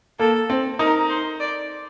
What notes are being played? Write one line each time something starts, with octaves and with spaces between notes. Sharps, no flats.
A#3 A4
C4
D#4 A#4
C5
D5